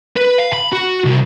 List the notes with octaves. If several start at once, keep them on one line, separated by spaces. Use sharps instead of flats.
B4
F5
B5
F#4
C2